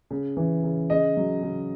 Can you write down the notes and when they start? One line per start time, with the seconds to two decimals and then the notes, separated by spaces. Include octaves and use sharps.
0.11 C#3
0.37 E3
0.64 C#3
0.90 C#3 D#5
1.17 F#3
1.43 C#3